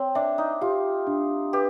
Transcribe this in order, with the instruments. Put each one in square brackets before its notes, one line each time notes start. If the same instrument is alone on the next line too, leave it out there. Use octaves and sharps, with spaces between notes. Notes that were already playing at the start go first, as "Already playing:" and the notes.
Already playing: [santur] C4 [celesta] C#5
[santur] D4 [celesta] E5
[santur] D#4
[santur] F4 [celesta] G4
[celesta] D4
[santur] G4 [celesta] B4